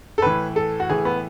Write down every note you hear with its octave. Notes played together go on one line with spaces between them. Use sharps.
A4
A2 E3 B4
A4
F#4
A2 E3 G#4
B3